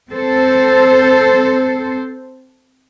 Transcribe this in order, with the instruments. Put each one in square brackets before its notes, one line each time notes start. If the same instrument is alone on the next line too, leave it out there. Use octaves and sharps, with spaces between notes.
[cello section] C4 A4 C5